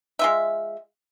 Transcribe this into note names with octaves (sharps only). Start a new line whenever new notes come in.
G#3 F4 E5